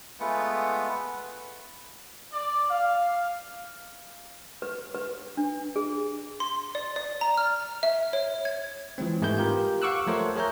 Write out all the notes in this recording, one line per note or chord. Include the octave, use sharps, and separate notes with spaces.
G#3 A3 B3 F4 B4 F#5
D5
F5
B4
B4
D4
G#4
C6
D5
D5
A#5
F6
E5
C#5
G#6
E3 F3 G#3 C4
G#2 A3 G4 B4 G6
F4 G4 A#4
F5 F#5 C#6 D6 E6 F#6
F3 A3 A4 A#4 C5 C#5
G#4 A#4 C#5 E5 A#5 G6